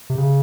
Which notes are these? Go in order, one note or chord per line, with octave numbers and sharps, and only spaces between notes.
C3
C#3